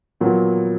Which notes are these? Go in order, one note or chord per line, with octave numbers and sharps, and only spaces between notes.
A#2 F#3 B3